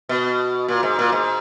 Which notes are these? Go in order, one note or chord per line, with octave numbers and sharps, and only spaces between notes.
B2
A#2
G#2
A#2
G#2